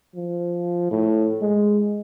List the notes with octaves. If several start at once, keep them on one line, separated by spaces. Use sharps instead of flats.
F3
A2
G#3